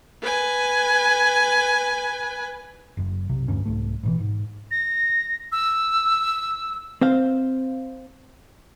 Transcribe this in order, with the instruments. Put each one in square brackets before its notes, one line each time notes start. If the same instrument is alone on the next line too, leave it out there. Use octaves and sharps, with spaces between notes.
[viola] B4 G#5
[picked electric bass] F#1 F#2
B1 C3
E1 D2 G2 C#4
C2 G#2 A3
A1 B2 E3
G#2
[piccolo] A#6
E6
[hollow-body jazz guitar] C4 C5 F5